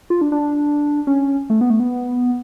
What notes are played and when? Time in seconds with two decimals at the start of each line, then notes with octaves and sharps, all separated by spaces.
0.10 F4
0.21 D4
0.32 D4
1.07 C#4
1.50 A3
1.61 B3
1.70 A3
1.80 B3